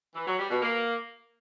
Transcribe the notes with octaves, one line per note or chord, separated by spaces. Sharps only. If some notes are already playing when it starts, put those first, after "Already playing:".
E3
F#3
G3
B2
A#3